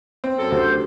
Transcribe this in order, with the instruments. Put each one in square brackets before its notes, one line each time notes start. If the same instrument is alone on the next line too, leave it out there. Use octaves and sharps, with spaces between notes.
[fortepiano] C4
[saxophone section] F#2 A4
[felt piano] D2 [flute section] G4 C5